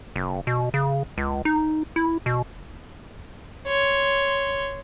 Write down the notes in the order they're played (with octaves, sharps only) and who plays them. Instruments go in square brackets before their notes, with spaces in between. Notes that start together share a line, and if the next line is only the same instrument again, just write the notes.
[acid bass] F#1
B2
C#3
C#2
D#4
E4
B2
[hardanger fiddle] C#5 C6